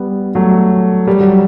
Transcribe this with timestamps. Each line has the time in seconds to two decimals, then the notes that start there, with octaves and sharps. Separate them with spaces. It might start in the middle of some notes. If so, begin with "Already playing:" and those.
Already playing: G3 B3
0.35 F#3 A3
1.07 G3
1.20 F#3